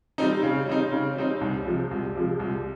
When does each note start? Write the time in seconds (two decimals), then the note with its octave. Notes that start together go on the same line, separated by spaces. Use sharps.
0.18 G3 C4 D#4
0.43 C#3
0.67 G3 C4 D#4
0.92 C#3
1.16 G3 C4 D#4
1.41 C2
1.66 C3 F3 G#3
1.91 C2
2.15 C3 F3 G#3
2.39 C2